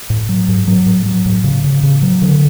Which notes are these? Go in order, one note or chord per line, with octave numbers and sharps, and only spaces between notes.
A2
F#3
G#2
F#3
A2
F#3
A2
C#3
C#3
C#3
F#3
D3